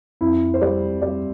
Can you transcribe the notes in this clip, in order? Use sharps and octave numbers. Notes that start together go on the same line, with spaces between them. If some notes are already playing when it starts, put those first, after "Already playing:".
F2 E4
C5
G3 D5
G3 D5